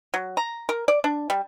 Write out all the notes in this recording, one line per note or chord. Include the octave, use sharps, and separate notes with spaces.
F#3
A#5
A#4
D5
D4
G3